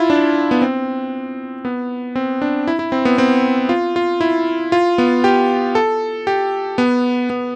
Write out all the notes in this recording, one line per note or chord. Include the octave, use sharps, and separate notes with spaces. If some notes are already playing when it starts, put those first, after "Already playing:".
Already playing: E4 F4
D4
B3
C4
B3
C4
D4
E4
E4
C4
B3
C4
F4
F4
E4
F4
B3
G4
A4
G4
B3
B3